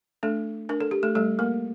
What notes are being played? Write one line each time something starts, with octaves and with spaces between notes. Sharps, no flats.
A3 D4 A4
D4 A#4
A4
G4
A3 A4
G3 A3 A4
A#3 A#4